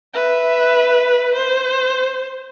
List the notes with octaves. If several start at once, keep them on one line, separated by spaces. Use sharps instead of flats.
B4 E5
C5